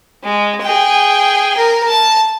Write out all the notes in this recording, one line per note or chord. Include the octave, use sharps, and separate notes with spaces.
G#3
G#4 G5
A#4
A5